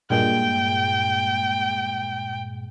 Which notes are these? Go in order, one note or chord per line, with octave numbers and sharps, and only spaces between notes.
G2 A#2 G#3 G5